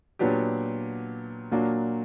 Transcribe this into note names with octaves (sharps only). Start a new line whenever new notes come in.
A#2 F#3 B3 D4 G4
A#2 F#3 A#3 D4 F#4